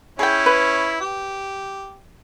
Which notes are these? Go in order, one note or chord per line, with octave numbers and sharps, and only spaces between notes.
C#4 E4 G#4 G5
B4
G4